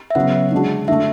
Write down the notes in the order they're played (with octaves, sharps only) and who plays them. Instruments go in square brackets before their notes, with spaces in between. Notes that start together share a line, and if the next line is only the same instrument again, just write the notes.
[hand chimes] E5
[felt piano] C#3 F#3 B3 [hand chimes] F#5
[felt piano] D3 G#3 D4 F#4
[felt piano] D3 A3 D4 [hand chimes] E5